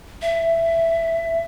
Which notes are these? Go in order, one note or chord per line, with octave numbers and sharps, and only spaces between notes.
E5